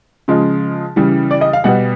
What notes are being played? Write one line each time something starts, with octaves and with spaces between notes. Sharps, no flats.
C#3 F3 G#3
C#3 E3 G3
D5
D#5
F5
B2 G3 B3 F#5